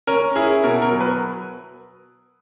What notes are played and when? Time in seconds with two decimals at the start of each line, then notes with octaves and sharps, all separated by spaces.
0.07 C#4 A#4
0.36 E4 G#4
0.64 B2 A#4
0.82 A#4
0.91 F#3
1.01 B4